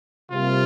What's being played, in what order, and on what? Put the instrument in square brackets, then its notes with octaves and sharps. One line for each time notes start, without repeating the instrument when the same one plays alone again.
[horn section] C3 [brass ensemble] G3 A#3 F4